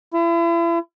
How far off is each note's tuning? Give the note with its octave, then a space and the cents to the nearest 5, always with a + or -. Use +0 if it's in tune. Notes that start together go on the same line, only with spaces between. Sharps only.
E4 +40